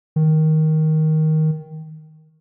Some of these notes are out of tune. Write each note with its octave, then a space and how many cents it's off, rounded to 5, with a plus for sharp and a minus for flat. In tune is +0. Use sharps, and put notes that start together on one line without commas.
D#3 +10